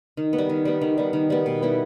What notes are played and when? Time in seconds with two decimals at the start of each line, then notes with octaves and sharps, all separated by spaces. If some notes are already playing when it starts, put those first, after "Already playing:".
0.17 D#3
0.33 B3
0.38 G3
0.49 D#3
0.65 G3 B3
0.81 D#3
0.98 G3 B3
1.13 D#3
1.30 G3 B3
1.46 B2
1.62 G3 B3 E4